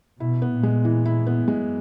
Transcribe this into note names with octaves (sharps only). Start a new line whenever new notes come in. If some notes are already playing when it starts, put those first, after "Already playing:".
B2 E4
B3
A#2
G#3
E3
E4
B3
F#2 G#3